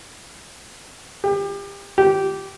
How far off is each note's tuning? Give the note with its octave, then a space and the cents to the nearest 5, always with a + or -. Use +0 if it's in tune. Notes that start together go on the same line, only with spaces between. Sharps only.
G4 +30
G4 -15